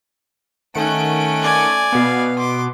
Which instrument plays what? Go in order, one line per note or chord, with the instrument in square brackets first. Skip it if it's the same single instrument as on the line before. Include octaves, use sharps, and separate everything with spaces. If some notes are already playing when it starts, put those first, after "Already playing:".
[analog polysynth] D#3 F#5 D7 [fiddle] A3 C#4
[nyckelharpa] D5 G#5
[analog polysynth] B2 B3 [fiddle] F5
[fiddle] C6 D6